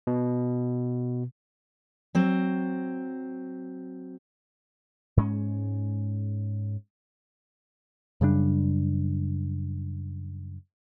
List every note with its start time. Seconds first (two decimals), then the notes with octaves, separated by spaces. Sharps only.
0.07 B2
2.15 F#3 C4
5.17 G#2 G#3 B3 C#4
8.21 F#2 C#3 G3 D4